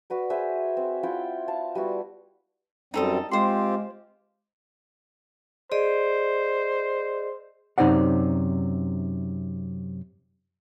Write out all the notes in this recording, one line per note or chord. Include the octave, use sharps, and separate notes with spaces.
F#4 B4 D5
G#4 B4 C5 E5
C4
E4 F4 F#5 G5
F5 A5
G3 B3 E4 F#4
F#2 G3 C4 D#4 A4 D#6
G#3 C4 F4 G4 C5 C6
G#4 C5 D5 D#5
F#2 C3 D#4 C5 D5 F#5